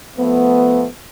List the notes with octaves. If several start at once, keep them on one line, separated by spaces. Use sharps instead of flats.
F3 A3 B3